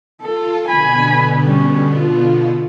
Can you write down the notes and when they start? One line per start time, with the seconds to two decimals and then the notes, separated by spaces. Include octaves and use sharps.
0.22 F4 A4
0.68 B2 D3 B3 G#5 B5
1.44 G3 C#4
1.95 F4